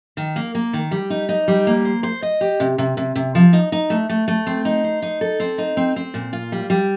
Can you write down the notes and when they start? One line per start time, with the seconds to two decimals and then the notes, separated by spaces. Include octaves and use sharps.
0.17 D#3
0.36 A#3
0.55 A#3
0.73 D#3
0.91 G3
1.10 D#4
1.29 D#4
1.48 G3
1.67 A#3
1.85 C5
2.03 C5
2.22 D#5
2.41 G4
2.60 C3
2.78 C3
2.97 C3
3.15 C3
3.35 F3
3.53 D#4
3.72 D#4
3.90 A3
4.09 A3
4.28 A3
4.47 C4
4.65 D#4
4.84 C5
5.02 D#4
5.21 A4
5.40 C4
5.58 D#4
5.77 C4
5.96 C4
6.14 A#2
6.33 F4
6.52 G3
6.70 G3